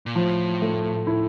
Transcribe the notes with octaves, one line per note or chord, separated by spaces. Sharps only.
A#2
A2 F3
A3
E4